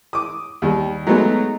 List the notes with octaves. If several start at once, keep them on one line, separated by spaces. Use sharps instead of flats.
D6 D#6
D#2 G3
F#3 G#3 A3 B3 D#4